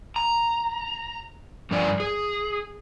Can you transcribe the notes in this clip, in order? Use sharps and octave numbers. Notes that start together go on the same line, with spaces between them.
A#5
G2 F3 D4 A#4 D5 G#5
G#4